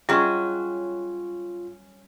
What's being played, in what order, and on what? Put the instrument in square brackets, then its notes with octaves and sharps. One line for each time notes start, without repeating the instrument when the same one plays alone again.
[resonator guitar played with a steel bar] F#3 C#4 [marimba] G3 [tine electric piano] F4 [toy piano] G#4 D#5 C#6